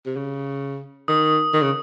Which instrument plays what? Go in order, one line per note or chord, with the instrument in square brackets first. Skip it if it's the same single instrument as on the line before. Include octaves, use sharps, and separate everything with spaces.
[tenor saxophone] C3
C#3
[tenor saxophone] D#3 [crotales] D#6
[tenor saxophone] D#3
C#3